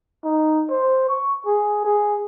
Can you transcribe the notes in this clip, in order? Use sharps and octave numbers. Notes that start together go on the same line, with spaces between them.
D#4
C5
C#6
G#4
G#4